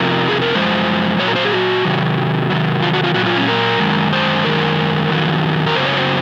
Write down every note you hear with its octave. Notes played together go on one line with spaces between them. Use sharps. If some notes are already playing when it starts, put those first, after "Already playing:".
Already playing: F2 C3 F3 A#4
G#4
A#4
F#2 F3 G#3 C5
A#2 F#3 C#5
A#4
C5
G#4
F#4
C3 D#3 F#3
C3 D#3 F#3
F4
F#4
F4
A#2 F#3 F#4
F4
C#4
A#4
F#2 D#3 G#3
C5
F#2 D#3 G#3 A#4
F2 D#3 F#3
A#4
F#2 C#3 F#3 C5
C#5
A#4
C5